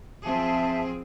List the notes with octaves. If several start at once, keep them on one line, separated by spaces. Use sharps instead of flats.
F3 C4 G#4 E5 A5